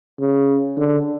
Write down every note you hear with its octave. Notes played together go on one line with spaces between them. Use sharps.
C#3
D3